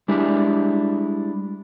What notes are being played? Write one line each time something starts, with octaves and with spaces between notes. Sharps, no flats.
G3 G#3 D4 E4